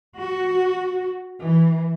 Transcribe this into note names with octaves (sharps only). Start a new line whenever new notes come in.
F#4
E3